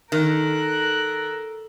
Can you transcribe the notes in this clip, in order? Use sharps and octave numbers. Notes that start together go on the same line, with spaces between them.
D#3 A4 A#4 F#6